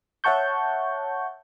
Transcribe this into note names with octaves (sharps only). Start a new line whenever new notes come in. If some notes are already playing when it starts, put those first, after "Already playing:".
C#5 E5 F#5 A5 C#6 G6